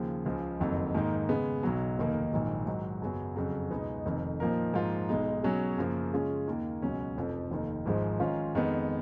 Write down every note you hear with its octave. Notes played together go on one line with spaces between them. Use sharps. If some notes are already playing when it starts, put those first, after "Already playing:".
Already playing: D#2 C#3 F3
C#2 C#3 F3 G#3
F#1 F2 D#3 F#3
G#2 D#3 A#3 D#4
C#3 G#3 B3
B1 B2 F#3
F1 D#2 D#3 A#3 D#4
A#1 G#2 D#3 F#3
G#2 D#3 F#3
F#2 C#3 F#3 B3
F2 C#3 F#3
C#2 B2 G#3 B3 D#4
F1 F2 D#3
A#2 F3 A#3 D#4 A#4
G#2 F3 A#3 F4
B1 B2 G#3 D#4
B2 F#3 C#4 G#4
F#2 C#3 F3 A#3
C#3 G#3 C#4 F4 G#4
D#2 D#3 A#3
C#2 B2 F#3 C#4
F1 F2 F3
F1 D#2 D#3
G#1 G#2 F3 G#3
G#2 D#3 G#3 C#4 F4
F2 D#3 G#3 B3